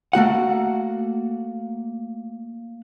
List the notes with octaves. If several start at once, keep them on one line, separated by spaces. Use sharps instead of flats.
A3 A#3 F#4 F#5